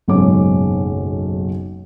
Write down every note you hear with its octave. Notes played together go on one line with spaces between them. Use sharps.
F#1 B1 G#2 G#3 C#4 D6